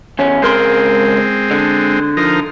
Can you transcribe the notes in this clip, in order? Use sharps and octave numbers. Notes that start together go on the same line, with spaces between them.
E2 C#4
C#2 G#3 C4 A#4 C6
D3
F3 D#4 A#4